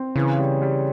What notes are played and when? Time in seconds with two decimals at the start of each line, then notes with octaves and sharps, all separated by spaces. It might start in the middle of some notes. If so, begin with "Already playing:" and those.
Already playing: C4
0.15 C#3 E3
0.39 G3
0.62 G3